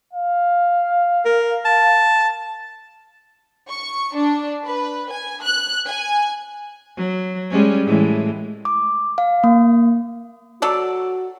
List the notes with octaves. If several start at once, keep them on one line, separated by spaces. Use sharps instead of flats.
F5
A#4
A5
C#6
D4
B4
G#5
F#6
G#5
F#3
G3 G#3 C#4
A2 E3 G#3
D6
F5
A#3
F#3 F#4 A4 D5